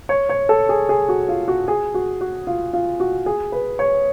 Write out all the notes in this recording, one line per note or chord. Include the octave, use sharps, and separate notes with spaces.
C#5
C#5
A4
G#4
G#4
F#4
F4
F#4
G#4
F#4
F#4
F4
F4
F#4
G#4
B4
C#5